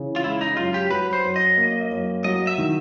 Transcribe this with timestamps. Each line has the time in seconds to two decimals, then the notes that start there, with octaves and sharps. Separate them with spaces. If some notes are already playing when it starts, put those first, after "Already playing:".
Already playing: C#3 E3
0.16 F4
0.24 G#3 E4
0.41 D#4
0.57 F#2 F4
0.74 G4
0.90 F#3 B4
1.13 C5
1.24 F#2
1.36 D#5
1.57 A#3
1.92 F#2
2.24 F#3 D#5
2.47 E5
2.58 D#3